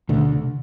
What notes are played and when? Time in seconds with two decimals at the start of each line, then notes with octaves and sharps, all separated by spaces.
0.09 D2 B2 D3
0.30 C3